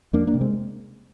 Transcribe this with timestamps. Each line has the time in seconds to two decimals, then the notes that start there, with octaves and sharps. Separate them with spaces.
0.13 F2 A#3 D4
0.27 A#3 D4
0.34 C3
0.41 G#3 C4